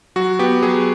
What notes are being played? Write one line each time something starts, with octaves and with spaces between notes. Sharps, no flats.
F#3 F#4
B3 G4
F#3 G#4